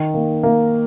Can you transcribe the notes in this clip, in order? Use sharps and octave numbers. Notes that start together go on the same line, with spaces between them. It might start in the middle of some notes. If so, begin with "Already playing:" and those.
Already playing: D#3
A#3
A#3